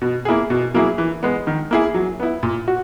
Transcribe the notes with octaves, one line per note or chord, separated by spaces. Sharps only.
B2
A#3 E4 G#4
B2
F#3 A#3 E4 G#4
E3
G#3 B3
D#3
A#3 E4 G#4
F#3
B3 E4
A#2
F#4